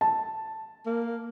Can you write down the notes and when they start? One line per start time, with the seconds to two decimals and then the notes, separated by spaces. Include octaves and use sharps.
0.01 A5
0.86 A#3